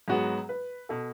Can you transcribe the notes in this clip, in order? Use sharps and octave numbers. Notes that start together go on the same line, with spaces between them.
G#2 F#3 B3 F#4 G#4
B4
B2 A4